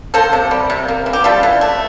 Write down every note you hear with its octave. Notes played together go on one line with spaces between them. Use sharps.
A#3 A4 C5
C3
G3
C3
A#3
E3
G4
G3 F4 A4
E3
A3